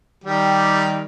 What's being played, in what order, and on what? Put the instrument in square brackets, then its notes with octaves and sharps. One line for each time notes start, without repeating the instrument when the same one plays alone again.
[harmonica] D#3 G3 [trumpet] G4